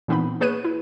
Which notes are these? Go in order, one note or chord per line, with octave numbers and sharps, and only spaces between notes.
A#2 E3 B3 C4 D#4 B5
A#3 G#4 B4 C#5 F#6 D#7
E4